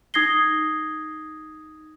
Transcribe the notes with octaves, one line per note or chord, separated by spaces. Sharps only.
D#4 D#6 G#6 A#6 C7 G7